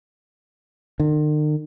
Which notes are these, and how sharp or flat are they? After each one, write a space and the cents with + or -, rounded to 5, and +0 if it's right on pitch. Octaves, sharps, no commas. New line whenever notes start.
D#3 -45